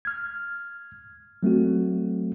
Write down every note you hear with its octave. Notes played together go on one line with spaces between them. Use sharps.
F6 G#6
F#3 A3 C4 F#4